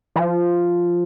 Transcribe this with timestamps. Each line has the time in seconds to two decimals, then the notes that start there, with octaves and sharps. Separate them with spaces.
0.16 E3
0.19 F3